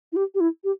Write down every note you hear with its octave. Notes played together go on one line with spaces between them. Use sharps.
E4
G4
G4
E4
G4